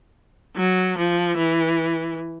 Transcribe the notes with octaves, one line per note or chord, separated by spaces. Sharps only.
F#3
F3
E3